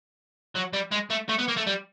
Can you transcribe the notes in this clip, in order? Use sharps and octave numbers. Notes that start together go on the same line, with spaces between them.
F#3
G3
G#3
A3
A3
B3
A#3
A3
G3